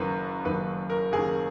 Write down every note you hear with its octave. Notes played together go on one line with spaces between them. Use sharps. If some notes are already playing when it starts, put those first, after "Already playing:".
Already playing: F#1 F#2 D#3 A#3 B4
F#1 F#2 D#3 A#3 B4
A#4
F#1 F#2 D#3 A#3 G#4